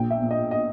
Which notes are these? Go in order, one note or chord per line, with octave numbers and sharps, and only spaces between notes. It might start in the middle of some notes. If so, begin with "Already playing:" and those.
Already playing: A#1 G5
E5
A#2
D#5
D#5